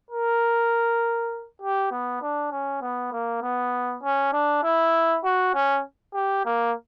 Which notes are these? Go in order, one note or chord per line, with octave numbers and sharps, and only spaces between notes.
A#4
G4
B3
D4
C#4
B3
A#3
B3
C#4
D4
E4
F#4
C#4
G4
A#3